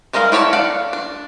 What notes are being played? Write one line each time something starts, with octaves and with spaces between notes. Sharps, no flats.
G3 G#3 A#4 D#5 F5
E4 G4 C#5 D5 A5
A4 D5 F5 F#5
D4